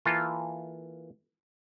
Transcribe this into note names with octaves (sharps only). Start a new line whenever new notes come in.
E3 A#3 F4 A4